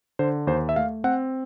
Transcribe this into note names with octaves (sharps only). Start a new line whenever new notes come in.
D3 C5
D#2 C5
E5
A3 F5
C4 F#5